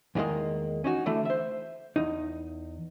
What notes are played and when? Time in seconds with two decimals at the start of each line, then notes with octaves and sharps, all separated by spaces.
0.15 E2 D3 D#3 G#3 A#3
0.84 C#4 D#4 F#4
1.06 D3 E3 A3
1.25 C5 E5
1.96 E2 D#4